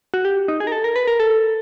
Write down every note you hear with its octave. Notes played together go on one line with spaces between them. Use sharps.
F#4
G4
D#4
G#4
A#4
A4
A#4
B4
A#4
A4